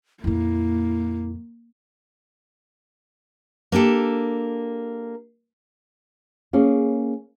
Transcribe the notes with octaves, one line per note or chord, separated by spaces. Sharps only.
F2 A#2 A#3 E4
A#3 D4 G4 A4
A#3 C#4 G#4